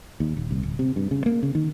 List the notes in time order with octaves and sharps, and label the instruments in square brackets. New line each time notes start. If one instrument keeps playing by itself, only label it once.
[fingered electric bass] D#2
D#1
C2
D1
C3
G2
C#3
A#3
C#3
D#3